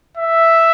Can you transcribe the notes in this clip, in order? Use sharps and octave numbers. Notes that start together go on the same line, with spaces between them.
E5